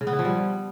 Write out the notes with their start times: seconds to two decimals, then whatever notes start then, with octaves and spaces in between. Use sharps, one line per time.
0.01 C#3
0.07 B3
0.13 E4
0.19 F3
0.25 G3